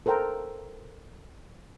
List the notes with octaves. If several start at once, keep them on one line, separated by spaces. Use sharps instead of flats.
A4 A#4 C5 G5 A#5